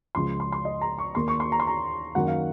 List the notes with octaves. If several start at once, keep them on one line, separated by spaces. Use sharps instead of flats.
C#2 C#3 F3 G#3 C6
C6
C6
D#5
A#5
C#6
D#2 D#3 A#3 C6
C#6
C6
A#5
C6
A#5
F#2 D#3 F#3 A#3 F#5
F5